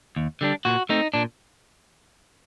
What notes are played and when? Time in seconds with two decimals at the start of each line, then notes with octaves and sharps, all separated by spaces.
0.16 D#2
0.41 D3 G3 D4
0.65 A#2 F#4
0.89 A3 C4 D#4
1.14 A#2 D4